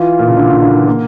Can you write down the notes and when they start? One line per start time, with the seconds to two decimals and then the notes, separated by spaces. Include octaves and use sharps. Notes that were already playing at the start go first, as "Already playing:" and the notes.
Already playing: E3 F4
0.19 A#2
0.28 C#3
0.37 D3
0.50 C#3
0.62 D3
0.74 E3
0.87 A#3